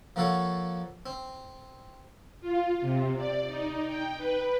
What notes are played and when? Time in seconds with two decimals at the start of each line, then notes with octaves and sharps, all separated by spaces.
0.16 F3 A#3 F#4 A4 C#5
1.06 C4
2.41 F4
2.81 C3
3.16 D5
3.47 D#4
3.87 G5
4.17 B4